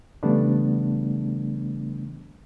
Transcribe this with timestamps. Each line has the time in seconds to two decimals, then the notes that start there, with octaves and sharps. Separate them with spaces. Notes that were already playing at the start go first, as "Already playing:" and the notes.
0.23 C#3 E3 G3 A3 B3 D4